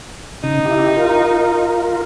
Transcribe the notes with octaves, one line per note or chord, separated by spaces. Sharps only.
C#3 D#4
E4 G4
F4 A#4